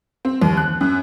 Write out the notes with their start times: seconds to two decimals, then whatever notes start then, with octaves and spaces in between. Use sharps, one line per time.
0.25 C4
0.42 D#2
0.57 F#6
0.81 F#2